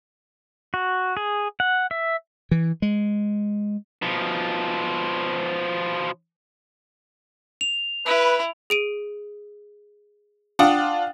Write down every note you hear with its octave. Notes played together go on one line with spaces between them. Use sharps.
F#4
G#4
F#5
E5
E3
G#3
B2 F3
F7
E4 B4
G#4 D7 D#7
D4 F4 F#5 G5 D#6